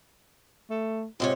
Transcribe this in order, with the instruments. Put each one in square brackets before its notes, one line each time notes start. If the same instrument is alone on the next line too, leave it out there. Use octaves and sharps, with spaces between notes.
[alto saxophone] A3
[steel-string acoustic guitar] G#2 C3 C#5 [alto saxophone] F4